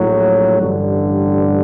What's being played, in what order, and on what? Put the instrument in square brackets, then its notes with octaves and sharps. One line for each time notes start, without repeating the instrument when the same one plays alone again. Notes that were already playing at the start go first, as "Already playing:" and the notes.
Already playing: [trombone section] A#1 A2 F#3
A1 G2 D3